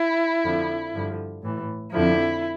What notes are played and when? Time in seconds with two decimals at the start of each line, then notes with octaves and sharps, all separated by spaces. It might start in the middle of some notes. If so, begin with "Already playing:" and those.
Already playing: E4
0.44 F2 D3 F3
0.94 G2 D3 F3
1.43 A2 E3
1.93 F2 D3 F3 E4